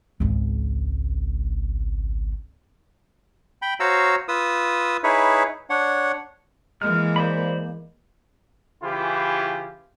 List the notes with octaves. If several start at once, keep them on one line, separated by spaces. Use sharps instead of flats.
G#1 C#2
G5 B5
F#4 C5 C#5 F5 A#5 E6
F4 B4 D#6 E6
D#4 E4 G#4 B4 C#5 E5
D4 C#5 F#5
E3 G#3 A#3 F6
C5 D5 B5
C#3 E3 E4 F4 G4